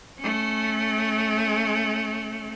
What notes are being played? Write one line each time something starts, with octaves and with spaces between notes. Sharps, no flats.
A3 C#4